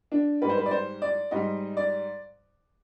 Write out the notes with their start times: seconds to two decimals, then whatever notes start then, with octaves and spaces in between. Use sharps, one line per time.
0.12 D4
0.42 G#2 G3 B4
0.49 C5
0.57 B4
0.66 D5
0.71 C5
1.02 D5
1.31 G#2 G3 D#5
1.77 D5